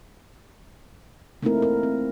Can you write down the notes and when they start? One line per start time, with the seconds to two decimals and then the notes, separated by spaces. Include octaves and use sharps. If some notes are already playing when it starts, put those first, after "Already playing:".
1.43 A3 A#3 C4 D#4 E4 A#4
1.62 A#4
1.83 C4